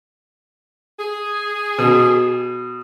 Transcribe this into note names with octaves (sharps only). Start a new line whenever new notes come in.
G#4
B2